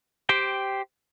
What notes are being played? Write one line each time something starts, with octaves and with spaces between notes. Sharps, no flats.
G4 C5 G5